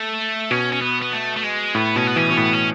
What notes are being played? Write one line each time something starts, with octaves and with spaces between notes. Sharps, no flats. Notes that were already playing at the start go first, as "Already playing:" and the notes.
Already playing: A3
B2 C#4
C#4
B3
B3
A3
A3
G#3
A2 B3
B2 C#4
B3
E3 C#4
B2
A2 B3
C#4